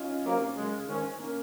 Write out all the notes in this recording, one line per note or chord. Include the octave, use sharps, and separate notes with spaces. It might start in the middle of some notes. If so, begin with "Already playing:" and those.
Already playing: C#4 D#4 F4
C3 F#3 A#3
F#2 C#3 G#3
G#2 D#3 G#3 C#4
A#3 C#4